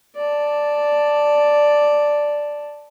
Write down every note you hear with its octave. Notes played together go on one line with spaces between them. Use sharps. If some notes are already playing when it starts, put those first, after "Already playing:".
D5 A5